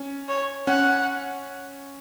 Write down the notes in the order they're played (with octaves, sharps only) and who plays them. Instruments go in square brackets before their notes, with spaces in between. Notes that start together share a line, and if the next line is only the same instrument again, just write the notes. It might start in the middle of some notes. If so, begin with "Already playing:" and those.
Already playing: [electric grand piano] C#4
[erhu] C#5
[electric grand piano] C#4 [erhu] F#5